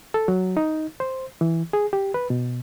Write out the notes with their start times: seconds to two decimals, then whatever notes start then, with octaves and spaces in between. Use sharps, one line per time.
0.14 A4
0.28 F#3
0.57 D#4
1.00 C5
1.41 E3
1.73 G#4
1.93 G4
2.14 B4
2.30 B2